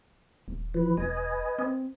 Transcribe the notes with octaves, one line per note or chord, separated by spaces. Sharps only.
D#1
E3 F3 B4
E1 B4 D#5 G#5
C4